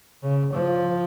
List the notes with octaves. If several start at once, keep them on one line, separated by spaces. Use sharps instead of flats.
C#3
F3